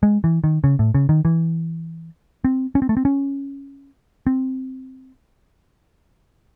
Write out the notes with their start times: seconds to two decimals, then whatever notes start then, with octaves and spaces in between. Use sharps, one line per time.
0.03 G#3
0.24 E3
0.44 D#3
0.64 C#3
0.79 A2
0.94 C#3
1.09 D#3
1.25 E3
2.44 C4
2.75 C#4
2.82 C4
2.89 A3
2.97 C4
3.05 C#4
4.27 C4